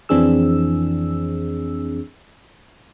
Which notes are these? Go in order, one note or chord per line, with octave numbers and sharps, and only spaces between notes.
F2 E3 C4 D4 G#4 E6